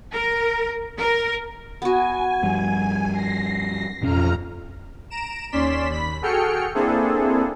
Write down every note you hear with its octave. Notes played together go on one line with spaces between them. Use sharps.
A#4
A#4
B3 F#4 G#5
G2 F3 G3
A#6 C7
A1 F2 B2 C#4 A#5 F6
A#5 D7 E7
D#2 C#4 D5 C6 B6 E7
D#2 B5 B6
F#4 G#4 A4 G5 F6 C#7
A#3 C4 D4 E4 G#4 A4